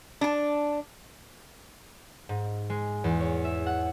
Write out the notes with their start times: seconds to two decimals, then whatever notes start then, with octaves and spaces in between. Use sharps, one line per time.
0.21 D4 A5
2.29 G#2
2.70 G#3
3.04 E2
3.20 C#5
3.45 E5
3.66 F#5